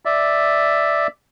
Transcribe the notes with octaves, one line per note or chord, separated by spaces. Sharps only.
D5 E5